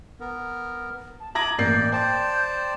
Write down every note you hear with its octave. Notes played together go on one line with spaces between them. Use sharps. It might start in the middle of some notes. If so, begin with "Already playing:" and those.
B3 A#4
A5
A#5 D6 D#6 G#6 A#6 F#7
A1 A#3 D5 G6 C7
C5 D5 G5 A5